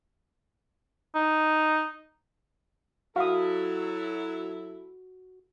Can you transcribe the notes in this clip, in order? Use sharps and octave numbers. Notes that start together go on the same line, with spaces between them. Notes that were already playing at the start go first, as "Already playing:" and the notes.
D#4
F#3 E4 F#4 A4 F5 D#6